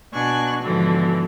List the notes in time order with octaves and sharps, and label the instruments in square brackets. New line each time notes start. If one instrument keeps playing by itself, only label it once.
[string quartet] B2 D4 G#5 C#6 F#6
G#2 B2 D3 E3 F3